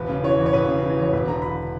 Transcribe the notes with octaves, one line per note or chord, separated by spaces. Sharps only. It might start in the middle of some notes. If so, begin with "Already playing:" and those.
Already playing: E1 B4
C#3
E3 C#5
E2
C#5
E1 B4
C#3
E3
E2 C#5
E1 B4
D3 A#5
E1 B5